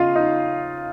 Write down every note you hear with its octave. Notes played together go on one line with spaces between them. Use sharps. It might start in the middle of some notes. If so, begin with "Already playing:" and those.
Already playing: C#3 F4 D#5 F5
D#4